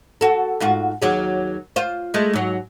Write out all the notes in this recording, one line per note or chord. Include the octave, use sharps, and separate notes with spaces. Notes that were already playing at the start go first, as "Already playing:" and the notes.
F#4 A4
G#2 F4 F#4
D#2 F#3 G#4
F4 C5
G#3 A3
G#2 F#3